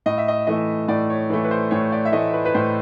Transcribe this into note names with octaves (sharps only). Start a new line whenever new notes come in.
A2 D#5
E5
D#5
E3 A3 D#5
A2 D5
C#5
E3 A3
B4
C5
A2 C#5
D5
E5
E3 A3 D#5
B4
B4
A2 C5